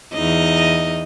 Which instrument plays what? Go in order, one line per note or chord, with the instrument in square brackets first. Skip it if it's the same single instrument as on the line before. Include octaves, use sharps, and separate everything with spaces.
[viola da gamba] E2 D#4 D#5